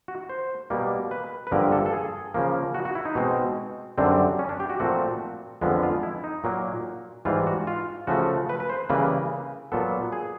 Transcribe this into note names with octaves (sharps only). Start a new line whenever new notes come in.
F#4
C5
B2 G3 A#3
B4
B4
G2 D3 F3 A#3 A#4
A4
A4
G#4
C#3 F3 A#3
F#4
F#4
E4
D#4
B2 G#3 C4
F#2 D3 G3 C4 D4
C#4
D4
G4
F#4
A#2 F3 A3 C4 F#4
F2 D3 F3 G#3 B3
F4
E4
D#4
A#2 F#3 A#3
G#2 E3 G3 F4
F#4
F4
C#3 F3 A3 F#4
B4
B4
C5
C#3 E3 G3 A#3 B4
A#2 F#3 B3 A4
G#4